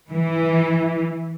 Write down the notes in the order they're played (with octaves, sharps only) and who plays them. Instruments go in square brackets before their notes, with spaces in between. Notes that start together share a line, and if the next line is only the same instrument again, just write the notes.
[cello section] E3